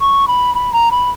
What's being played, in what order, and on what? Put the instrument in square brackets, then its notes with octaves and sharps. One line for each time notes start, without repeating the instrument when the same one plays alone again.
[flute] C#6
B5
B5
A#5
B5